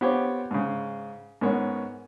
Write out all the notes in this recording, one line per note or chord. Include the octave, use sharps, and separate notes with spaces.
B3 C4 F4 G4 C5 C#5
G#2 C#3
G#2 D#3 B3 C#4 C#5